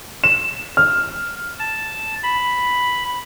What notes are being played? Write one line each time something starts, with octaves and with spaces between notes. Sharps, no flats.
E7
F6
A5
B5